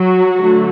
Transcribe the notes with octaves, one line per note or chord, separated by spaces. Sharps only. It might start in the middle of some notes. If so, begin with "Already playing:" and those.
Already playing: F#3 F#4
D3 F#3 A3